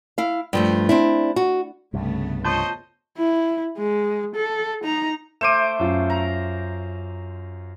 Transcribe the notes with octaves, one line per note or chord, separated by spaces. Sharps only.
E4 F5
G2 F3 A3
C4 D4 E4
F#4
C2 G2 C#3 A3 B3
F4 C5 C#5 D#5 A5 G6
E4
G#3
A4
D#4 A#5
A3 C5 D6 D#7 E7
F#2 F4
A#5